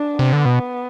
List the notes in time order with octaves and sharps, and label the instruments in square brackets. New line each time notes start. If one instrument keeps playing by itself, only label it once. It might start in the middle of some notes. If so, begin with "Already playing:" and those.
Already playing: [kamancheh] D4
[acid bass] C3 [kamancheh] B3
[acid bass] D3
B2